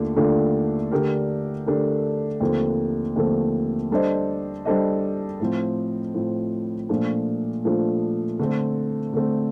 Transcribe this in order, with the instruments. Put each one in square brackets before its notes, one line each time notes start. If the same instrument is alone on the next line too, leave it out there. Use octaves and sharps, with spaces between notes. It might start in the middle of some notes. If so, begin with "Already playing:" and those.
Already playing: [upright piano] D#2 D3 A3 D4 F4
D#2 D3 A3 D4 F4
D3 A3 D4 G4 A#4
D3 A3 D4 G4 A#4
D#2 D3 F3 A3 C4
D#2 D3 F3 A3 C4
G3 D4 A4 C5 D#5
G3 D4 A4 C5 D#5
A2 F3 C4
A2 F3 C4
A#2 F3 A3 D4
A#2 F3 A3 D4
D3 A3 C4
D3 A3 C4